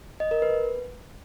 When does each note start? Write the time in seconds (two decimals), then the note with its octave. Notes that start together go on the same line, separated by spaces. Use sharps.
0.20 D#5
0.31 A#4
0.42 B4